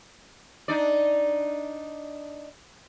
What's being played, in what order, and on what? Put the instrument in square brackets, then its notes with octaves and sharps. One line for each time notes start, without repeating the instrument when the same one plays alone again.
[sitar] D4 D#4 D5